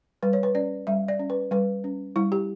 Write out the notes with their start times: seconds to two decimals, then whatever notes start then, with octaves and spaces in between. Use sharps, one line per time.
0.23 G3 B4
0.33 C#5
0.43 B4
0.55 C#4 D5
0.87 G3 E5
1.08 D5
1.19 C#4
1.30 B4
1.51 G3 B4
1.84 C#4
2.16 G3 E4
2.32 G4